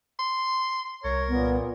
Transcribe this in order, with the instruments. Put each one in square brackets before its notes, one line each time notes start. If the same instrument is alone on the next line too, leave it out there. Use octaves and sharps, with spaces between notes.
[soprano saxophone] C6
[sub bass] C2 [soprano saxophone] A#4 [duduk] C#5
[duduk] A#2 [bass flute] B3